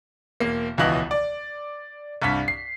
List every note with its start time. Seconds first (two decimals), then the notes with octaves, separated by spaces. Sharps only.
0.40 E1 A#3
0.78 D#1 C#2 B2 E3 D#5 F#7
1.11 D5
2.22 C2 G2 B6
2.48 C7